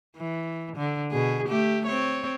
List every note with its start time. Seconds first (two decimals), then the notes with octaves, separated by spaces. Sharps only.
0.17 E3
0.77 D3
1.12 B2 G#4
1.47 A3 G4
1.87 C4 C#5